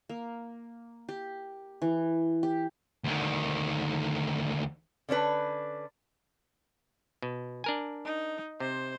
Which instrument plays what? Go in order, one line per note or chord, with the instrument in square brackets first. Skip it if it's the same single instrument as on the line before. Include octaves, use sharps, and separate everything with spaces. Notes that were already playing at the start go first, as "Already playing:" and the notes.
[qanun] A#3
G4
E3
G4
[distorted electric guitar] D2 D#3
[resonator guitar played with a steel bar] D3 C#4 D4 B4
[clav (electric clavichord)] B2
D4 A#4 G#5
[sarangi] D#4
[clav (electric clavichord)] C3 [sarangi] C5